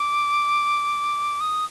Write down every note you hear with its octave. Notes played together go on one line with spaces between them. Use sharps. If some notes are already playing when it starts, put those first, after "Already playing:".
Already playing: D6
D#6